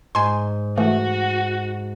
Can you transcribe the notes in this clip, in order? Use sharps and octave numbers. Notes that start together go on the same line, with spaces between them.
G#2 G#5 C6
E3 A3 F#4